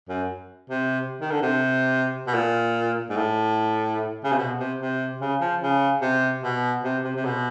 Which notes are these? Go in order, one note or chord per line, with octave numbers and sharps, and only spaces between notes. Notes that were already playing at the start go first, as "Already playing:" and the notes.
F#2
C3
D#3
D3
C3
B2
A#2
G#2
A2
C#3
C3
B2
C3
C3
C#3
F3
C#3
C3
B2
C3
C3
C3
B2